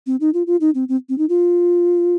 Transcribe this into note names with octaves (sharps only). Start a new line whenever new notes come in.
C4
D#4
F4
F4
D#4
C4
C4
C4
D#4
F4